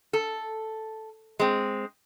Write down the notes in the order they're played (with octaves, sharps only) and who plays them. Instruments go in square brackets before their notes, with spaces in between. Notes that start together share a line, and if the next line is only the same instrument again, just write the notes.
[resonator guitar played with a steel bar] A4
G#3 C4